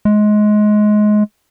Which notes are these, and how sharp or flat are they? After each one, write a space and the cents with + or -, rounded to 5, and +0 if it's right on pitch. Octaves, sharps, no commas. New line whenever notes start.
G#3 +20